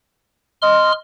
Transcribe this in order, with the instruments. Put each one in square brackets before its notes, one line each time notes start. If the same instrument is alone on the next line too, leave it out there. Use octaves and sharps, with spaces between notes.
[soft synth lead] D#5 [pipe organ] C6 F6